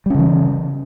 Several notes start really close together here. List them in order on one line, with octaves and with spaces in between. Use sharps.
G3 C#4 C#3 E3